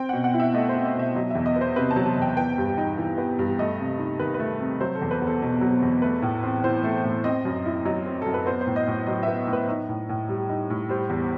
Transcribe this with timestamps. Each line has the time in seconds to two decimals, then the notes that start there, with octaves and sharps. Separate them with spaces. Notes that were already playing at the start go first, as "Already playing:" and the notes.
Already playing: C4 G5
0.09 B2 F#5
0.24 F#5
0.34 E4
0.40 E5
0.54 A3 D#5
0.69 C5
0.75 C4
0.85 D#5
0.95 B2 E5
1.15 F#3 D#5
1.30 E2 E5
1.46 D#5
1.56 B3
1.61 C5
1.76 C3 B4
1.91 A5
1.96 F#3
2.06 A5
2.17 E2 G5
2.37 B3 G5
2.58 G2
2.78 D#4
2.98 E3
3.18 B3
3.39 G2
3.59 A3 D#5
3.79 C3
3.99 D#4
4.19 D#3 B4
4.34 B4
4.39 A3
4.60 C3
4.80 F#3 C5
4.95 A4
5.02 E2
5.11 B4
5.22 E2
5.27 A4
5.42 B2
5.61 F#3
5.82 E2
6.02 A3 B4
6.22 A2
6.43 C4
6.64 E3 C5
6.84 A3
7.04 A2
7.24 C4 D#5
7.45 F#2
7.66 E4
7.85 F#3 D#5
8.06 C4
8.22 F#2 A4
8.34 B4
8.46 B3 C5
8.61 C5
8.67 A2
8.76 D#5
8.87 A2
9.07 F#3 D#5
9.23 B3 E5
9.47 A2
9.53 B4
9.69 D#4
9.89 A2
10.09 A2
10.29 G3
10.49 D#4
10.70 A2
10.89 G3 C5
11.10 E2